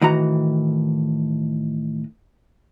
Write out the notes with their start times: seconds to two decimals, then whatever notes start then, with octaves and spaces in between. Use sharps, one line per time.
0.02 A2 D#3 E3 F#4 A#5